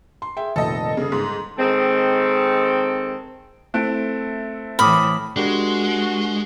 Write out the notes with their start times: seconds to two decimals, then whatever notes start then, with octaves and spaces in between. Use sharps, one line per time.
0.22 C6
0.37 G#4 E5 G5
0.56 F1 A#1 D#3 A4 D#5
0.97 G1 C#3 A4 D#6
1.12 G#2
1.59 D#3 G#3 C4 A4
3.74 A3 C4 E4 F#6 D7
4.79 A2 E3 B5 D6 D#6 F6
5.36 G#3 D4 F#4 G4 A#4